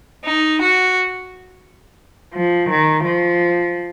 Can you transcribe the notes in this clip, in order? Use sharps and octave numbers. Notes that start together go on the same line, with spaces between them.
D#4
F#4
F3
D#3
F3